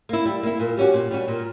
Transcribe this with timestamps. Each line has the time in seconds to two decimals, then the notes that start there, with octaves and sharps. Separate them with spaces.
0.09 A#3 E4
0.25 G3
0.43 A#3 E4
0.59 A#2 A#4
0.76 G3 C#4 F#4 G4
0.93 A#2
1.11 G3 C#4 F#4
1.27 A#2 A#4